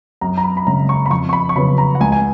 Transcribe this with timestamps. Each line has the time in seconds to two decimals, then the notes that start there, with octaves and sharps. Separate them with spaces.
0.21 F#2 A#5
0.37 A#5
0.44 B5
0.57 B5
0.67 C#3 G#3 A#5
0.89 C#6
1.06 B5
1.10 F2 C#6
1.29 C#6
1.33 B5
1.49 C#6
1.56 C#3 F#3 B3 B5
1.78 A#5
1.95 F#5
2.00 C#2 G#5
2.12 G#5